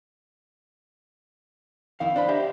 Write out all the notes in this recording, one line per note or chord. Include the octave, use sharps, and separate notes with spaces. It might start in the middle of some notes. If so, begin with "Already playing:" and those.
F2 D#3 E4 F5
D4 C5 B5
G4 D#5 E5 G5